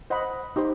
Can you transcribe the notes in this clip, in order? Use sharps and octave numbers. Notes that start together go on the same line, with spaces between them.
C5 D#5 F#5 B5
D#4 G4 C5